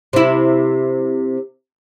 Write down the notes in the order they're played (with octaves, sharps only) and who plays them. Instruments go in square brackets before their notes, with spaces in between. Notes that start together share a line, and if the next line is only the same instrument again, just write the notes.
[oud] C3 E4